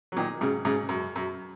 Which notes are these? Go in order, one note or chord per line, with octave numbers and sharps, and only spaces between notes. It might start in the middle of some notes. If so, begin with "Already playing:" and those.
F#3
A#2 D#3
G#2 C#3
G#2 C#3
F#2
F#2